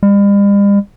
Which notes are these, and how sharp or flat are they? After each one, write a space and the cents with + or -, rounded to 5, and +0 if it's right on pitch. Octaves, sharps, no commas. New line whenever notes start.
G3 +45